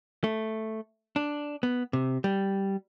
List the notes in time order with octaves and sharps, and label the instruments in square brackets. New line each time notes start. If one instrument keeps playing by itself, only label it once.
[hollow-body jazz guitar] A3
D4
B3
C3
G3